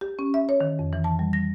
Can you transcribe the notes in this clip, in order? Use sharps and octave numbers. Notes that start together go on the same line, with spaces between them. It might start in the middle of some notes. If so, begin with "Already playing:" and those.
G4
C#4
E5
C#5
D#3
F2
E3
A5
G3
A#6